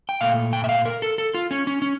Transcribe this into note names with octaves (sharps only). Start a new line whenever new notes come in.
G5
A#2 A3 F5
G5
E5
F5
A#4
A4
A4
F4
C#4
C#4
C#4